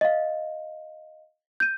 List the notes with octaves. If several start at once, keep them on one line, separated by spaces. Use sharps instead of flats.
D#5 F5
G6 D#7